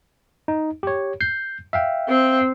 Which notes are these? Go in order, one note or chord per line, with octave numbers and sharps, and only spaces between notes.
D#4
G4 C#5
G6 C7
E5 F5 G5
C4